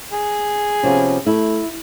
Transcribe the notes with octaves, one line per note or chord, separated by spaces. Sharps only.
G#4
C3 F3 B3 C#4
A3 E4